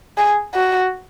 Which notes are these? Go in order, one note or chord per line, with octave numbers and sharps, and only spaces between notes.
G#4
F#4